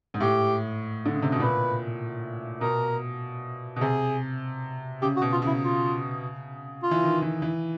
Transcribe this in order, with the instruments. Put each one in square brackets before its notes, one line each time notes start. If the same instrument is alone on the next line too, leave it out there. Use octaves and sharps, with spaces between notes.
[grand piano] G#2
[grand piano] A2 [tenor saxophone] G4
[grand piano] D3
C#3
C3
B2
[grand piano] A#2 [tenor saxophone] B4
[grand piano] B2 [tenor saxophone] A#4
[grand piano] B2
[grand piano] C3 [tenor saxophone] G#4
[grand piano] C#3 [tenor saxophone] G4
[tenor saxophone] F#4
[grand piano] B2
[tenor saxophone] F4
[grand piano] C#3 [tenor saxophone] E4
[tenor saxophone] F4
F4
[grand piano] E3
D#3
E3
E3